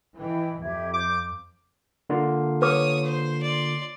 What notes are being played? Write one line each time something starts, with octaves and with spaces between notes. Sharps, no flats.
E3 E4 D#5 G5
F2 G4 E5 G#6
C5 D6 G6
D3 A#3 F4
B4 C#5 D6 D#6
C5
D5 C6